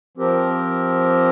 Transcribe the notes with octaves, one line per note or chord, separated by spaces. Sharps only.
F3 C4 G4 A#4